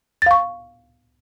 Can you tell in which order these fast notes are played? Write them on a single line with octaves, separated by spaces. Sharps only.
A6 F5 C#6